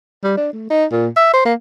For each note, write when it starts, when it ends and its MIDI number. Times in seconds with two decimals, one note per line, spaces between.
0.24 0.36 55
0.37 0.49 62
0.53 0.69 57
0.70 0.85 63
0.92 1.07 46
1.17 1.32 76
1.33 1.43 72
1.45 1.54 58